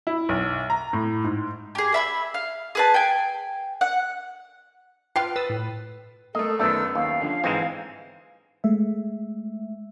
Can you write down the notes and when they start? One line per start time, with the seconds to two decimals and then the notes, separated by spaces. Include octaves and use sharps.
0.07 E4
0.29 B1
0.70 A#5
0.93 A2
1.24 G#2
1.75 G4 G#4
1.94 E5 B5 E6
2.34 F5
2.75 G#4 B4 A5
2.94 G5 G#5
3.81 F#5
5.16 F4 B4 F5 G5 A5 F6 C7
5.36 B4 D#6 E6 A6
5.50 A2
6.35 A3 A#3 A4 D#5
6.59 F#2 D#3 A3 B3 D5 E6
6.95 D#2 F5
7.21 D3 F3 C#4
7.44 G#2 E3 G#3 C4
8.64 G#3 A3 E5